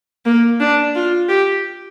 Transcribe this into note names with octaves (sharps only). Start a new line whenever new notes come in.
A#3
D4
F4
G4